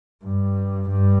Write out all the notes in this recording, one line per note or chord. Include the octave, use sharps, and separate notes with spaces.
G2
G2